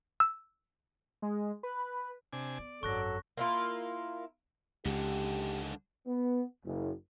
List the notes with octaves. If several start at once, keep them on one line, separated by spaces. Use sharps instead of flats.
E6
G#3
B4
C3 D4 G#5
B3 D5
G#1 F#2 F#3 A4 C#6 F#6 A#6
A#3 E4 F4
C#2 G#2 D3 G4
B3
F#1